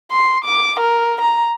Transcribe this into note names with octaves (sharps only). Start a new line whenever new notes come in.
C6
D6
A#4
A#5